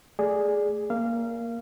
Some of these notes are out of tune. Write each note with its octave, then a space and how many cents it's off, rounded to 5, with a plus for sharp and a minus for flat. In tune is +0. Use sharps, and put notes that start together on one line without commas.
A3 -5 G#4 +0 D5 +0
A#3 +0 F5 -20